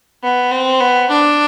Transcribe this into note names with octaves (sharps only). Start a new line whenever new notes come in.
B3
C4
B3
D4